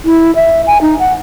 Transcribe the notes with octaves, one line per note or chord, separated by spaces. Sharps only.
E4
E5
G#5
D#4
F#5